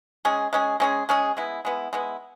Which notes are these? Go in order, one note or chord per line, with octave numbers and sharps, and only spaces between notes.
G#3 C#4 G#4
G#3 C#4 G#4
G#3 C#4 G#4
G#3 C#4 G#4
G#3 B3 E4
G#3 B3 E4
G#3 B3 E4